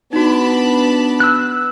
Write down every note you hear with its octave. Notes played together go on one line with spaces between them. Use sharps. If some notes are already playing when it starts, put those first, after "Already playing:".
B3 D4 D#4 F#4 A5 B5
E6 F#6